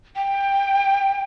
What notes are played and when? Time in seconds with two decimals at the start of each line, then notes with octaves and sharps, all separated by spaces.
0.16 G5